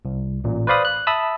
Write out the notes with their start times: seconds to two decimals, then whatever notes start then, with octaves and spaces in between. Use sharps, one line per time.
0.05 C2
0.44 A1 A#2
0.67 B4 C5 D5 F5 B5 D#6
0.85 F#6
1.07 E5 A5 B5 D#6 E6